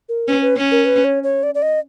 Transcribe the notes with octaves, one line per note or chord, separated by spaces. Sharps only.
A#4
C#4 B4
B4
C#4
A#4
B4
C#5
C#5
D5
D5
D#5